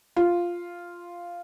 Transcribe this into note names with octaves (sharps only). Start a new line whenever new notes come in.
F4